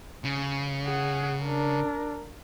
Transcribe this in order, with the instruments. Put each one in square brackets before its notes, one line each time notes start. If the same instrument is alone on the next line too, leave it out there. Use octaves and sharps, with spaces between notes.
[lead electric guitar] C#3
[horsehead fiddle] G#4 F#5
D4 A#4